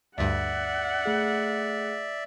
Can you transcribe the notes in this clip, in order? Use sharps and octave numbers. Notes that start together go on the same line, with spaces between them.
D2 G2 D5 E5 F#5
A3 G#4